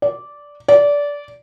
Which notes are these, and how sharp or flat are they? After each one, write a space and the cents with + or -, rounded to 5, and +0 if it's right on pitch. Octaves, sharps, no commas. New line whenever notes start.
D5 -10
D5 -20